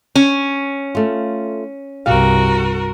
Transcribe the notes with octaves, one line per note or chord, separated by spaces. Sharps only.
C#4
A3 F4
C2 G2 F#4 G4 A#4 F5